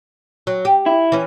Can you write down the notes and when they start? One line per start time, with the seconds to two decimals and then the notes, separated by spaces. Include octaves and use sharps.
0.47 F#3
0.65 G4
0.86 E4
1.12 E3 C#4